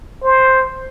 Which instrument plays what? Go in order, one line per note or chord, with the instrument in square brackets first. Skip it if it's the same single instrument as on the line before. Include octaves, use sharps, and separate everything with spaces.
[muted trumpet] C5